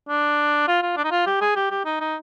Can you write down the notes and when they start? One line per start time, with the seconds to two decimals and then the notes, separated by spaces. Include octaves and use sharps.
0.09 D4
0.68 F4
0.82 F4
0.97 D4
1.05 D#4
1.11 F4
1.26 G4
1.41 G#4
1.56 G4
1.71 G4
1.85 D#4
2.01 D#4